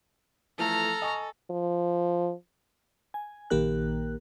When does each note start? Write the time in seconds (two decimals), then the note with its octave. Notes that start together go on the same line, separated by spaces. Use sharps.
0.58 E3 F3 A3 A4 A#5 F6
1.02 D#5 G#5 C#6
1.51 F3
3.14 G#5
3.50 A#1 D#3 A#3 G4 A#4 F#6